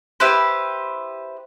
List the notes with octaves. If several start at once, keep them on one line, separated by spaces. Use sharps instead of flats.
E4 G4 B4 C5